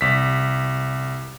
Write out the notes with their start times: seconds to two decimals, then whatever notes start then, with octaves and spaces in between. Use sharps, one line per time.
0.01 C2 B6